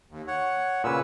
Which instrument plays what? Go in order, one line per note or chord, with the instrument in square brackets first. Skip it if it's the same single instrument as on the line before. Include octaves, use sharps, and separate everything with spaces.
[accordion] D#2
C#5 F#5
[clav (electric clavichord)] A#2 C#3 [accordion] B4 E6